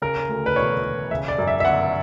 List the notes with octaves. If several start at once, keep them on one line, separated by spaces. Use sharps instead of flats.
C#3 A#4
D2
B4
E1 C#5
E1
C#3 E5
D5
F#2
E5
E5
G1 F#5